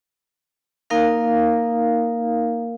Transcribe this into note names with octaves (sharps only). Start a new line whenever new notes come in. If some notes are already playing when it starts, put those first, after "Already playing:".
A#3 D#4 A#4 F5